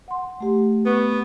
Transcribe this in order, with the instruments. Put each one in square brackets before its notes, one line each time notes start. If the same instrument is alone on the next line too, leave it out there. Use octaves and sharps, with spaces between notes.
[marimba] F#5 C6
A3 G4
[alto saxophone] B3 [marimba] C#6